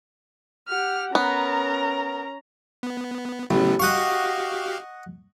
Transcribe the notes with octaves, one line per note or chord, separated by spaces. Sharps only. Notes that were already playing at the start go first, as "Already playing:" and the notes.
G4 F#5 F6
B3 C#4 A#4 A#5
B3
A1 C#3 F#3 B3
F#4 G4 D#5 F5 F#5 C#6